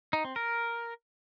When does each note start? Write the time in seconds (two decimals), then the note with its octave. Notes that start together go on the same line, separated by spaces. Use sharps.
0.13 D#4
0.25 C4
0.36 A#4